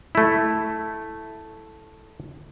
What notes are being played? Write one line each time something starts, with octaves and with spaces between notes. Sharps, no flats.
A3 E4